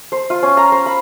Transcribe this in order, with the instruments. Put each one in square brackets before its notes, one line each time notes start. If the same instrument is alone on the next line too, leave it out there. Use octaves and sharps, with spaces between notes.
[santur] C5
F4
C#4
A#5
C5
B5